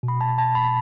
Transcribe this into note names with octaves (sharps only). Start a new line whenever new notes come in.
B2
B5
A5
A5
B5